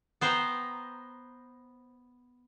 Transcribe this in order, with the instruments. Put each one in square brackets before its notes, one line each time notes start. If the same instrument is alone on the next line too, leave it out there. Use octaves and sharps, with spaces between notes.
[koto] B3 C5 G5 A#5